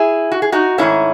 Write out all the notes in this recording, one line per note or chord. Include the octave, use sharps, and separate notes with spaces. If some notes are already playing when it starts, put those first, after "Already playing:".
Already playing: E4 G#4
F#4
G#4
D#4 F#4
G#2 D#3 F#3 A3 C#4 E4